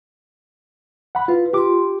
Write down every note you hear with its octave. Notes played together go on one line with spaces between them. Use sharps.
F#5 B5
E4 F4 B4
F4 G4 C6 D6